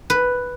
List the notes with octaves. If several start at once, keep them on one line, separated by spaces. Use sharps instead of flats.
B4